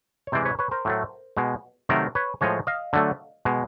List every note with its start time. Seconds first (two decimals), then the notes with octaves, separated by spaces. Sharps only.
0.27 C#5
0.32 C3 E3 G#3 C5 D5
0.45 B4 C#5
0.59 B4 C#5
0.71 A#4 C5
0.85 A2 F#3 A3
1.37 B2 G#3
1.89 C3 D#3 F#3 A3 A#4 C5
2.15 B4 C#5
2.41 A2 F3 G#3 C#5 D#5
2.67 D#5 F5
2.93 D3 F#3 A3
3.45 B2 G#3